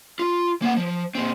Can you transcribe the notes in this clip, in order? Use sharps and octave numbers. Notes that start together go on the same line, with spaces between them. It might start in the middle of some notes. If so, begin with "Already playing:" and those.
F4
A#3 F#5
F3
A#2 C4